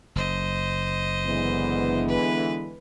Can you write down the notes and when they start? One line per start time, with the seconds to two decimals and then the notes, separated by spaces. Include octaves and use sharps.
0.15 F#1 C5 D#5
1.26 D3 E3 G#3 B3
2.08 B4